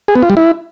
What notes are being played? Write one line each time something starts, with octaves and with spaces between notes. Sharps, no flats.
G#4
B3
F4
G3
E4